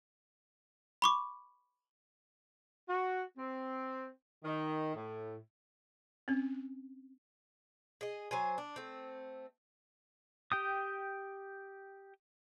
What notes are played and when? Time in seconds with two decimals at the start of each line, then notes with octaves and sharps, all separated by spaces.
1.02 B5 C#6 D6
2.89 F#4
3.38 C4
4.45 D#3
4.95 A2
6.28 C4 C#4
8.01 G#4 D#5
8.31 F#3 C5 G#5
8.58 D4
8.76 A3 C4
10.52 G4 G5 D#6